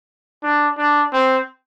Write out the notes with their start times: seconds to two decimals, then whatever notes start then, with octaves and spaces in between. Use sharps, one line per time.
0.43 D4
0.78 D4
1.13 C4